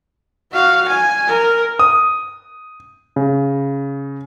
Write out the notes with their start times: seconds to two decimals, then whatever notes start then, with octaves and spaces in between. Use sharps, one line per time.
0.53 F#4 F5
0.88 G#5
1.28 A#4
1.79 D#6
3.16 C#3